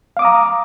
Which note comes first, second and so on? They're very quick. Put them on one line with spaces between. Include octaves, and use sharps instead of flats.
F5 D6 D#6 A#5